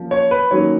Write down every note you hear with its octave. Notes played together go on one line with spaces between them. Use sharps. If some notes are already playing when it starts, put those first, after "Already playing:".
Already playing: F3 A#3 C#4
C#5
B4
D#3 F#3 A#3 C#4 C#5